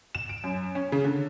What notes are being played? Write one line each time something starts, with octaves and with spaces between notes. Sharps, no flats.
E7
D7
F#2
C#4
C#3
D3